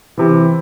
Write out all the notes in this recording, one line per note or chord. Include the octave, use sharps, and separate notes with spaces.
C3 E3